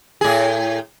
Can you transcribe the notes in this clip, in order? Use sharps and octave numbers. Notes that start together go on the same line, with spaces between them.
A2 G#4